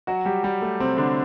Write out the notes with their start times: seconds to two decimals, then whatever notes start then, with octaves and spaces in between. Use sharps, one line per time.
0.07 F#3 F#4
0.25 G3 G4
0.43 G3 G4
0.62 A3
0.80 C3 C4
0.97 D3 D4